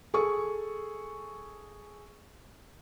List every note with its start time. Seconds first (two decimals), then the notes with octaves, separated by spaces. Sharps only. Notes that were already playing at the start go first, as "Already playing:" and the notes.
0.14 G#4 A4 C#6